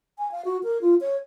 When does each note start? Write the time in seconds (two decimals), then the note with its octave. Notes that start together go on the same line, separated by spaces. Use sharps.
0.18 G#5
0.32 F5
0.45 F#4
0.63 A#4
0.82 F4
1.01 C#5